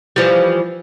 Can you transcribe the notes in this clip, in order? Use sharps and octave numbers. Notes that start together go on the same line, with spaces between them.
E3 F3 G3